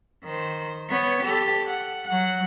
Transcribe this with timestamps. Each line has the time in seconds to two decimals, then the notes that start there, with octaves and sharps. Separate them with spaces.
0.24 D#3 C5
0.90 B3 C#5
1.24 G4 A4
1.66 F#5
2.06 F#3 F#5